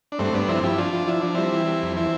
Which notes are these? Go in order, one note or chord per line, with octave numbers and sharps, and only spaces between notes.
D4
G2 A3 C4
G2 B3 D4
F3 C4 E4
F3 E4 G4
F3 D4 F4
F3
F3 E4
F3 D4
G3 C4 E4
E3
G3
F2
E3 C4 E4